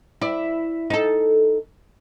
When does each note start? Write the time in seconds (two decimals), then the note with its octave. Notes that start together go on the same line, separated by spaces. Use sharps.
0.22 E4 D5
0.90 D#4 A4